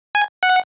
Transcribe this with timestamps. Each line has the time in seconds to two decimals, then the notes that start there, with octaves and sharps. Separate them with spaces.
0.15 G#5
0.43 F#5